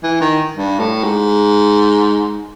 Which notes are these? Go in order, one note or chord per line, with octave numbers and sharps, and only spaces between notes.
E3
D#3
G2
A2
G#2